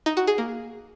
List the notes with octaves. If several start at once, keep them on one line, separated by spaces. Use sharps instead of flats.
D#4
F#4
G#4
A#3